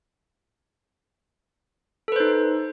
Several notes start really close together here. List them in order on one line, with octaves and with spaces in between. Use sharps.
A4 B4 C5 D#4